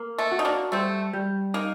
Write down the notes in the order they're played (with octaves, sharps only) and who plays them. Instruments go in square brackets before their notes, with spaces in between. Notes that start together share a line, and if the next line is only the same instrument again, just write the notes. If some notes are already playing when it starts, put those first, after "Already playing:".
Already playing: [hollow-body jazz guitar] A#3
[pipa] A3
[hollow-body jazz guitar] F#4
[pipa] D#4
A#3 D4
[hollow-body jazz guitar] G3 [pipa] A3 C4
[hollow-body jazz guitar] G3
[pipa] A#3 [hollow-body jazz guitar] D#4